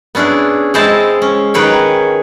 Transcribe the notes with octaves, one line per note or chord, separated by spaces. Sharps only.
B3 C#4 D4 E4 G#4
G#3 C4 E4 C5 D#5 A5
C#4
D#3 G#4 B4 C#5 G5